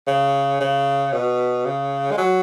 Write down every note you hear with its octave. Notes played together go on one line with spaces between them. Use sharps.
C#3
C#3
B2
C#3
G#3
F#3